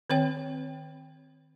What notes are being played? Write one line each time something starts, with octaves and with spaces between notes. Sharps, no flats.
D#3 C4 C#5 G5